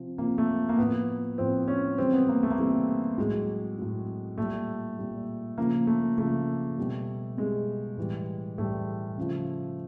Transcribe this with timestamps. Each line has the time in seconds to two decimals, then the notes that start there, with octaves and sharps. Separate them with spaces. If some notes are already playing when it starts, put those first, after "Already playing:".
Already playing: C3 F3
0.18 C3 F3 A#3
0.38 A3
0.69 A#3
0.78 A2 F3 B3
1.38 A2 F3 C4
1.68 C#4
1.98 C3 E3 G3 C4
2.13 B3
2.29 A#3
2.43 A3
2.51 A#3
2.58 C3 E3 G3 A3
3.18 A2 F#3 G#3
3.78 A2 F#3
4.38 A#2 G3 A3
4.98 A#2 G3
5.58 C#3 F3 A#3
5.87 A3
6.18 C#3 F3 A3
6.78 B2 G3
7.38 B2 G3 G#3
7.97 A2 E3 G3
8.58 A2 E3 G3 A3
9.18 C#3 F3